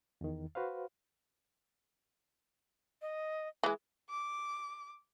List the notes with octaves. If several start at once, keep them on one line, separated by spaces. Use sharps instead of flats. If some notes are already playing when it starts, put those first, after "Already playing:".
E2 D#3
F#4 B4 C5 F5
D#5
E3 G#3
D6